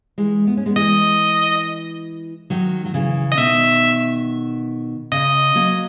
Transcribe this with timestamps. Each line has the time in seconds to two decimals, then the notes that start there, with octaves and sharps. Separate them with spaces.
0.18 E3 G#3
0.47 B3
0.57 C#4
0.66 G#3 B3
0.76 E3 G#3 D#5
2.50 D#3 F#3
2.85 F#3
2.94 C#3 E3
3.32 D#5
3.37 B2 D#3 E5
5.12 C#3 D#5
5.55 F#3 A#3